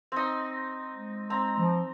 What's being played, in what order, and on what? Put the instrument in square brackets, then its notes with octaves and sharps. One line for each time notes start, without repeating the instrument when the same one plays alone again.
[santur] C4 D#4
[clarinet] G#3
[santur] C4 A#5
[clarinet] F3